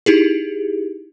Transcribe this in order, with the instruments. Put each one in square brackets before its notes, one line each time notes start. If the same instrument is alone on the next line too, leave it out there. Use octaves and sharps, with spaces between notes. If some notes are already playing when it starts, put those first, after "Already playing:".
[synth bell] D#4 E4 G4 G#4